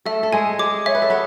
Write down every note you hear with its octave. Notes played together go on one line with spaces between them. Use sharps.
A3 A4 E5
A4
G#3 G#4 G#5
G#3 G#4 D6
C#5 E5
B4
A4
B3 B4